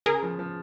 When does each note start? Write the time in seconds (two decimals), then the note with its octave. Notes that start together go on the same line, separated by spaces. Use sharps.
0.06 C#3 G#4 A#4
0.23 F3
0.39 F3